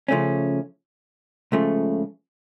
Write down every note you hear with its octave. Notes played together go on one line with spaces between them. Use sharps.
C#3 F3 A3 C#4
C#2 C#3 F3 A3